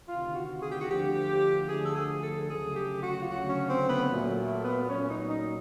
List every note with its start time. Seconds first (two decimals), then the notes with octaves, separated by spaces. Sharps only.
0.09 D2 C3 D#3 F4
0.36 F#4
0.62 G#4
0.71 G4
0.81 F#4
0.89 D2 D3 F3 G4
1.69 D2 D3 F3 G#4
1.85 A4
1.96 G#4
2.18 G#4
2.22 A4
2.41 A4
2.49 D2 C#3 F#3 A3 G#4
2.76 G4
3.03 F#4
3.20 F4
3.29 D2 C#3 F#3 A3 F#4
3.49 C#4
3.69 C4
3.89 B3
4.09 A#2 F#3 A3
4.36 A3
4.63 B3
4.89 A#2 F#3 A3 C#4
5.09 D#4
5.29 D#4